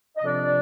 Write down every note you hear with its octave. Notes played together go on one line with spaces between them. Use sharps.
D#5
F2 C3 F3 C4 D4 D5